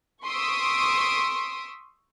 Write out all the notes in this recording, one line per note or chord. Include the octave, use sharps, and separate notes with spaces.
C6 C#6 D#6 E6 B6 D7